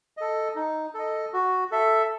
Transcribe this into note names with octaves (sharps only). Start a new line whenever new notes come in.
A4 D#5
D#4
A4 D#5
F#4
A4 E5